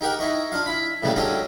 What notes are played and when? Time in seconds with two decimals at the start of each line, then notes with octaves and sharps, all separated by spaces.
0.01 D#4 G4 A#4 F#5
0.19 D#4 E4 D#5 C#6
0.52 D4 F4 F5
0.66 E4 B5
1.03 A2 C#3 E3 G3 G#3 A#3
1.16 F#3 C#4 D4 G4 A4 D#5